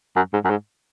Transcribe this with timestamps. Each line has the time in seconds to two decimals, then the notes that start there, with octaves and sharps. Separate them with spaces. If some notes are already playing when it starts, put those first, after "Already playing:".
0.16 F#2
0.33 G#2
0.44 F#2
0.50 G#2